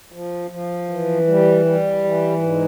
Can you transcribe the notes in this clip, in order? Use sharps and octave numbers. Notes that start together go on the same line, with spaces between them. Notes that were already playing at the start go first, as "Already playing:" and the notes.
F3
F3
E3
G3
G3
E3
G#2